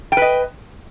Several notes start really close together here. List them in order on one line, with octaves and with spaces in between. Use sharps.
G5 B4 D#5